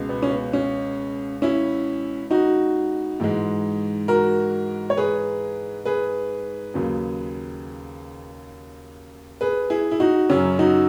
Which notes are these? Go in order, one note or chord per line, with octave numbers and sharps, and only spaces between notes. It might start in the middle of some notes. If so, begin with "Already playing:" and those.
Already playing: C#2 B2 G#3
B3
C#4
B3
C#4
C#4 E4
D#4 F#4
G#2 E3 G#3
F#4 A#4
C#5
G#4 B4
G#4 B4
D#2 C#3 F#3
G#4 B4
E4 G#4
E4
D#4 F#4
F#2 C#3 F#3 C#4
D#4 F#4